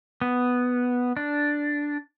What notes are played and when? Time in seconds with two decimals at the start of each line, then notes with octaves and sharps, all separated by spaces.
0.21 B3
1.17 D4